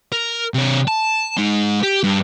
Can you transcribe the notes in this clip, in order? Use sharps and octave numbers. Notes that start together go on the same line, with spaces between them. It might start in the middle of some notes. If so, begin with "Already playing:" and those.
A#4
C3 C#5
A5
G#3 D#4
G4
G2